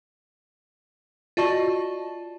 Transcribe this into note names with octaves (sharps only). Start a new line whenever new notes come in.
F4 F#4 D5 D#5 A5 C#6